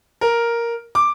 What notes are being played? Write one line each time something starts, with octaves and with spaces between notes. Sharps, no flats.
A#4
D6